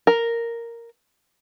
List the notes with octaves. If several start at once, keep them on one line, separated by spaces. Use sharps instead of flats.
A#4